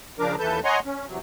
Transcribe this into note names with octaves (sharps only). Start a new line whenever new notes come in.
C#3 F3 D4 A#4 D6
D#2 E3 A4 B4 A5 G6
C#5 D#5 F#5 G#5 A#5 C6
C#4
E2 C3 F#3